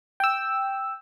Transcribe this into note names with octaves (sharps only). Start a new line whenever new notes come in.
G5 E6